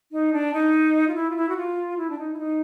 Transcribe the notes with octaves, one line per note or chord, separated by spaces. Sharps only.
D#4
D4
D#4
F4
E4
F4
E4
F#4
F4
E4
D4
D#4
E4
D#4